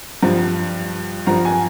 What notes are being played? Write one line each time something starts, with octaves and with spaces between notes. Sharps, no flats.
G2 F3
G2 F3 A#5
G#5